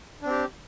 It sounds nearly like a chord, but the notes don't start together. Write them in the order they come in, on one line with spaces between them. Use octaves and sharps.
D4 C4 G4